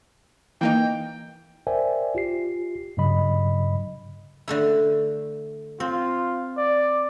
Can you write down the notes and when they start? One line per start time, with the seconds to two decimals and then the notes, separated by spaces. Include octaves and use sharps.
0.61 E3 A#3 D#4 G5
1.67 A#4 C5 D5 E5 G5 G#5
2.15 F4 G4 C7
2.97 G2 C#3 F#3 D#5 B5
4.48 D3 A3 E4
5.80 C4 F4
6.57 D5